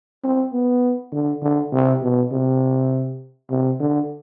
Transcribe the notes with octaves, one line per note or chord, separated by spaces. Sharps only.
C4
B3
D3
D3
C3
B2
C3
C3
D3